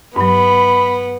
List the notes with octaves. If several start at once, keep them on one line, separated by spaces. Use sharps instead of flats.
G2 F#3 B3 B5